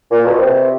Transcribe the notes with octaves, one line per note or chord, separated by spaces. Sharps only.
A#2
B2
C3